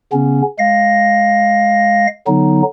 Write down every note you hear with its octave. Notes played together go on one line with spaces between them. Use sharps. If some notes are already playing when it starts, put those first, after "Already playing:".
C#3 B3 C#4
G#3 F5 A#6
D3 F#3 B3 D#4